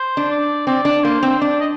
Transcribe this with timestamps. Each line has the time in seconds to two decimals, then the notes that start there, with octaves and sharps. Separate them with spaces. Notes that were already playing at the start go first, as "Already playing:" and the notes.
Already playing: C5
0.17 D4
0.30 D5
0.67 C4 D5
0.85 D4
1.04 A#3 C5
1.23 C4
1.41 D4 D5
1.60 D#5